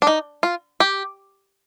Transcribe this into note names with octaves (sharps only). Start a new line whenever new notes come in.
D4
D#4
F4
G4